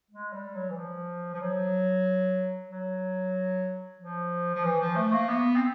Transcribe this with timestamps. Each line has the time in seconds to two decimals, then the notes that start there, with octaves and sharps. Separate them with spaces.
0.11 G#3
0.32 G3
0.55 F#3
0.70 E3
0.76 F3
1.34 F3
1.41 F#3
2.70 F#3
3.99 F3
4.55 F3
4.64 E3
4.80 F3
4.96 A3
5.13 A#3
5.28 B3
5.56 C4